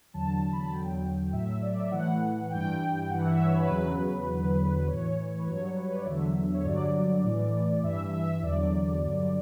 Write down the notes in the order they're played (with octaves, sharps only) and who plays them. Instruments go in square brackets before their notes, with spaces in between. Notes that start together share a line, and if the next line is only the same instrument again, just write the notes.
[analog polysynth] E2 D3 F#3 A5
B5
A5
E2 D3 F#3 G5
A2 F#3 E5
D5
E5
A2 E3 F#5
G2 E3 G5
G2 E3 F#5
E5
C#5
B4
E2 C#3 F#3 B4
E2 D3 F#3
B4
A2 E3 C#5
B4
G2 F#3 C#5
B4
C#5
D5
E2 D3 F#3 E5
C#5
G2 D3 F#3 D5
A2 E3
G2 E3 E5
E5
E2 D3 F#3 D5
G2 D3 F#3